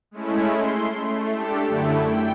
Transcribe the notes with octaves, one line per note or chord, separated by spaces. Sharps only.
G#3 A3 C#4 E4
C6
A3
D4 G4 A4
F#2 D3 A3 E4
G5